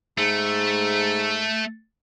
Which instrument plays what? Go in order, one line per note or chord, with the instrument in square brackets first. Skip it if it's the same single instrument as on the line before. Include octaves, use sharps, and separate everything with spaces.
[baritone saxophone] G#2 [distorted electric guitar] A3